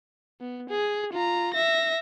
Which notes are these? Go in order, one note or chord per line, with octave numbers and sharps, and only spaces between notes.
B3
G#4
F4 A#5
E5 A#6